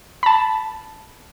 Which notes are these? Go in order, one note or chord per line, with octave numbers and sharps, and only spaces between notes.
A5 B5